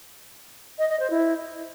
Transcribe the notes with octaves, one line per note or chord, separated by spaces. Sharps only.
D#5
D#5
C5
E4